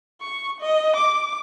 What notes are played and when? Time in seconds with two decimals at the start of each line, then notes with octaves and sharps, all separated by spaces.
0.21 C#6
0.61 D#5
0.96 D6